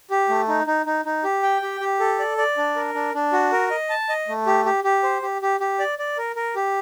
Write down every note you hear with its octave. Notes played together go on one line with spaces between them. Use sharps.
G4
A3
D#4
D#4
D#4
D#4
G4
G5
G4
G4
A4
D5
D5
D4
A#4
D4
D4
F#4
A#4
D#5
A5
D#5
A3
G4
G4
G4
C5
G4
G4
G4
D5
D5
A#4
A#4
G4